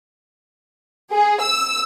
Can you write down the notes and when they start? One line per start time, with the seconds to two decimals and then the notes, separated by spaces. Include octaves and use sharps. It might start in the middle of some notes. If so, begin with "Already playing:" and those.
1.11 G#4
1.43 E6